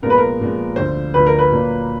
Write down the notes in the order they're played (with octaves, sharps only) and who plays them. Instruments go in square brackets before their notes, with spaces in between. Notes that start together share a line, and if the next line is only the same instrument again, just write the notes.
[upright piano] A#2 F3 G#3 B3 [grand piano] A#4
[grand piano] B4
A#4
[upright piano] A#2 F3 G#3 B3
[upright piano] D2 D3 F3 [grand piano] C5
[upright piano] D2 D3 F3 [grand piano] B4
[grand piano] A#4
B4
[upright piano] A#2 F#3 A#3